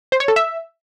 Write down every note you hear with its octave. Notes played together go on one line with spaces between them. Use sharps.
C5
C#5
A4
E5